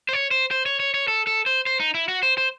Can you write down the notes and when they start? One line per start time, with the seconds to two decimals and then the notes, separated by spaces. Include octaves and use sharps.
0.09 C5
0.13 C#5
0.31 C5
0.51 C5
0.66 C#5
0.80 C#5
0.94 C#5
1.08 A4
1.27 A4
1.46 C5
1.66 C5
1.80 D#4
1.94 E4
2.08 F#4
2.23 C5
2.38 C5